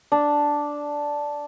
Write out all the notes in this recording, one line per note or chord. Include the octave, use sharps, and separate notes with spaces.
D4